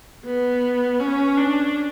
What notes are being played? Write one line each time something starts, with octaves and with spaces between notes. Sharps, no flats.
B3
C#4
D4